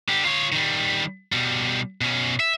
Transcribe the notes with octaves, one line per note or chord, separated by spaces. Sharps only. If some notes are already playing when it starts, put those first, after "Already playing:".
D3 G4
F4 C#5
D#3 G3
B2 G3
B2 C#4
E5